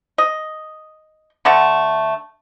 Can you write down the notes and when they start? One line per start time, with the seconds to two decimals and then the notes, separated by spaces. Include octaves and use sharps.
0.18 D#5
1.45 D3 A3 A4 F#5